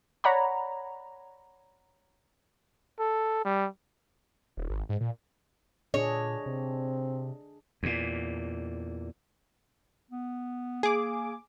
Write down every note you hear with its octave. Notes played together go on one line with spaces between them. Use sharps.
C#5 D5 F#5 A#5 B5
A4
G3
D#1
G#1
G#2
A#2
A#2 D4 G#4 C#5 D#5
C3 C4
E2 A#2
B3
A#3 G#4 D6